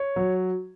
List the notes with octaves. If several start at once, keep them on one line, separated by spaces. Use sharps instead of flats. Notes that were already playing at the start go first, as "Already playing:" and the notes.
Already playing: C#5
F#3